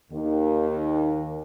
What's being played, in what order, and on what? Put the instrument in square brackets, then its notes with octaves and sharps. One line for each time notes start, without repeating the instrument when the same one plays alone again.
[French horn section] D#2 D#3